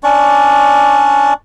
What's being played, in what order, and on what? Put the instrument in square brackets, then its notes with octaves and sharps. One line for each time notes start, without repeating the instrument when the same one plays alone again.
[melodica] C#4 D4 D5 C#6